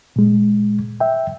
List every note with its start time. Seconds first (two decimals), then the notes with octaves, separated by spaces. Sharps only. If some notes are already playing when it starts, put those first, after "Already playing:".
0.16 A#2 G#3
1.00 E5 G5